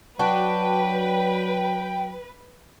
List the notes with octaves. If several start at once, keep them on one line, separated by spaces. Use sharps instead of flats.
F#3 D4 F#4 B4 G5